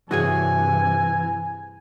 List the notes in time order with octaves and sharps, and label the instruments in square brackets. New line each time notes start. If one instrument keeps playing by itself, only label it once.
[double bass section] G2 C3 [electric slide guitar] E3 [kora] F#4 G#4 C#5 [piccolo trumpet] G#5